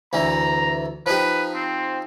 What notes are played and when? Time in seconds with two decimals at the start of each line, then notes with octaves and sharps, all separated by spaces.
0.13 D2 E3 A#5
1.06 F3 D#4 G4 B4
1.54 C4